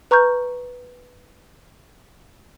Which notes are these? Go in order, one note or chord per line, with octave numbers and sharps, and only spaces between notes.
B4 A#5 C#6 F6 G6